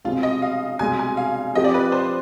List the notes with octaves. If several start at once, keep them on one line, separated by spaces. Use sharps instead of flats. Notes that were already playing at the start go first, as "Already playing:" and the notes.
C2 B2 G#3 C4 F4
D#5
F5
C2 B2 G#3 G#5
G#5
F5
F3 C4 G4 D#5
D5
B4
C5